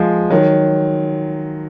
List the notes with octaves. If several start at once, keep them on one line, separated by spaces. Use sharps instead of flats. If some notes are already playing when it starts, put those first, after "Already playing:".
Already playing: F3 G#3
D#3 F#3